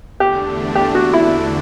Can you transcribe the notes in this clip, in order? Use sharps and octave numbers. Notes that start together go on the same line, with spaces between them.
E2 D3 A3 D4 G4
G4
F#4
E4